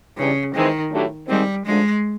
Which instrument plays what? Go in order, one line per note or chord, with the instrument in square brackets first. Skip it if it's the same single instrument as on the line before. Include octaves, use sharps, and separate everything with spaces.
[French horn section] G2 E3 G3 [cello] C#3
[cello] D#3 [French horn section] E3 G#3 C4
[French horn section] A2 F#3 A3 D4 G4
[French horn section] G#2 D#3 G#3 C4 [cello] G3
[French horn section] F#2 D3 F3 A3 D4 [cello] G#3